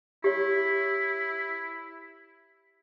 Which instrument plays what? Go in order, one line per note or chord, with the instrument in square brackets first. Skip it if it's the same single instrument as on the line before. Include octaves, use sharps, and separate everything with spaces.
[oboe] E4 [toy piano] G4 C#5